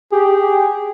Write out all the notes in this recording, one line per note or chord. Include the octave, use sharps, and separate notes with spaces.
G4 G#4